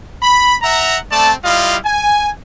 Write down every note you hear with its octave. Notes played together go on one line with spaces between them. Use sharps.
B5
E5 F#5 A#5
A3 C4 D5 A5
G3 E4 F4 D#5 F5
G#5